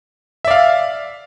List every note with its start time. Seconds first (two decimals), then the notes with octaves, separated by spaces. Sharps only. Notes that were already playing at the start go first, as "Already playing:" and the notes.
0.45 E5
0.48 D5
0.51 F5